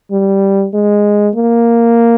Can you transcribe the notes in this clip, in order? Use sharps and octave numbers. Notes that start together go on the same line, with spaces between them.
G3
G#3
A#3